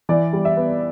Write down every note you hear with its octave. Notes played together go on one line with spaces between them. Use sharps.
E3 D5
G3
E5
B3